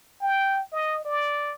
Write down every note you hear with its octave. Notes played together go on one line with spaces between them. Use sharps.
G5
D#5
D5